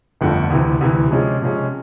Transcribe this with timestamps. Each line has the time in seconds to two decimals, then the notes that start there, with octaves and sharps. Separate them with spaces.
0.21 G1 F2 D3 F3 A3
0.50 D2 C3 E3
0.81 D2 C3 E3
1.11 C3 F3 G#3 C#4
1.42 C3 F3 G#3 C#4